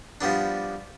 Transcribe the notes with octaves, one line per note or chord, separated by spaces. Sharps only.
F3 G3 B3 D4